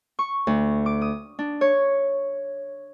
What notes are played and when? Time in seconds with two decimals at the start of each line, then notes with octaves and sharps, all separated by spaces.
0.19 C#6
0.47 D2
0.86 D6
1.01 D#6
1.39 D4
1.61 C#5